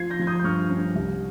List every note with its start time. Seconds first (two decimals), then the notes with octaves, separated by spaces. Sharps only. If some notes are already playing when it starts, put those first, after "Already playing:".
Already playing: F3 F4 G#6 C7
0.10 G6 A#6
0.19 F3 G#6
0.27 D#6 G6
0.39 G6
0.44 G2 C#6 F6
0.70 C#4
0.95 C2